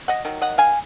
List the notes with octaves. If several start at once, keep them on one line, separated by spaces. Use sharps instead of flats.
D#5 F#5
D#3 F#3
D#5 F#5
F5 G#5